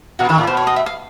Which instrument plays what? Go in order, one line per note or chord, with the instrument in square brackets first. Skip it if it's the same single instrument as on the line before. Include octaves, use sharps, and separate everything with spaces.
[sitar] A#2 [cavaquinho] F#4
[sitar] D#3 [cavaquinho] A4
[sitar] A2
[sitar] B2 [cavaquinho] C5
[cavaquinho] C#5
D#5
E5
F5